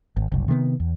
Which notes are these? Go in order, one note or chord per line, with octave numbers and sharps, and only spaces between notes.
G#1
F#1 C2
C3 D#3 A3 B3
E2